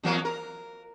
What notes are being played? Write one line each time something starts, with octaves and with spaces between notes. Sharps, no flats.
E2 F#3 A#3
A#4